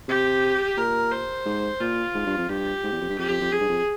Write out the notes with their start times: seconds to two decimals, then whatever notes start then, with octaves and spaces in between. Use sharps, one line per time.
0.08 C3 G4
0.77 A#2 A#4
1.11 C5
1.46 G#2
1.80 A#2 F4
2.14 G#2
2.26 G2
2.38 F2
2.49 G2 G4
2.84 G#2
2.92 E2
3.01 F2
3.09 G2
3.19 F2 G4
3.29 F2
3.41 F2
3.52 F2 G#4
3.60 G2
3.69 F2